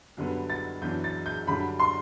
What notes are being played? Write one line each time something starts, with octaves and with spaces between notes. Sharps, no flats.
F#2 D3 G3 B3
A6
F#2 E3 B3 D4 G6
A6
G6
F#2 D3 G3 D4 B5
C6